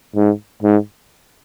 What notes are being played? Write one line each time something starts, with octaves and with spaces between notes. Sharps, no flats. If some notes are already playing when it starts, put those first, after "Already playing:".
G#2
G#2